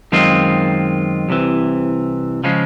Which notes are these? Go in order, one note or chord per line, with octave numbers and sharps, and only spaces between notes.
F#2 D#3 G#3 C4 F4
C2 C3 E3
C#3 F3 G#3 C#4